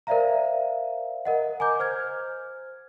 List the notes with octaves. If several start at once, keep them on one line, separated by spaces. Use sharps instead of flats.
A#4 C5 D5 E5 F5 A#5
A#4 D#5 F#5
G#5 A#5 D6 G6
C5 F6 G#6